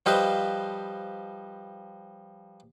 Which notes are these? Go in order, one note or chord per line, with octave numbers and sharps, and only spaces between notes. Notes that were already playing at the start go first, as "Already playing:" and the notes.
F3 G3 B4 C5 D#5 F5